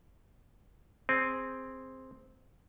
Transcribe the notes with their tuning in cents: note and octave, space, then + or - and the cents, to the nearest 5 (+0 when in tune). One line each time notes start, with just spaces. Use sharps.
C4 +0 G#4 -10